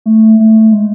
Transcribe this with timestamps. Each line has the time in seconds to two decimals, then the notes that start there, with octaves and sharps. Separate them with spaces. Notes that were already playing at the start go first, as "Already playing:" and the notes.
0.06 A3
0.40 A3
0.72 G#3